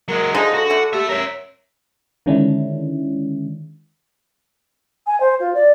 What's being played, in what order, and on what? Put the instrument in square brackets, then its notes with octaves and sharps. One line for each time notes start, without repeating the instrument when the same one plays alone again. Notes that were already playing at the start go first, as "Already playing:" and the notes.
[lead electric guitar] F#3 G#3 [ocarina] A#4
[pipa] D3 F3 G#3 [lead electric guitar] D#4 [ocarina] G#4
[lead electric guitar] F#4 [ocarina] A4
[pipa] D3 A3
[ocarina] G4 [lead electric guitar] A4 E5
[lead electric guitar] A#4 E5 [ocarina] C#5
[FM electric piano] D3 D#3 G#3 C#4 D4 E4
[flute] G#5
C5
F4
D5